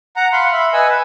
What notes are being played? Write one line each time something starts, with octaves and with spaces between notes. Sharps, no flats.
F#5 A#5
F5 F#5 B5 C6
E5 B5
B4 D#5 G#5 E6
B4